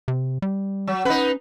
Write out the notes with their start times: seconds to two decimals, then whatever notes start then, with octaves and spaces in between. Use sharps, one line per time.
0.08 C3
0.42 G3
0.87 F#3
1.05 C#4 D#4 B4